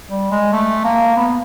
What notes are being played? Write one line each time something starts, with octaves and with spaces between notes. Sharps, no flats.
G3
G#3
A3
A#3
B3